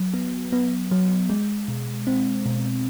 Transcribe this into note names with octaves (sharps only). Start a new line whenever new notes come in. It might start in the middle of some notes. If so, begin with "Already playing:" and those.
Already playing: F#3
B3
B3
F#3
G#3
B2
C4
B2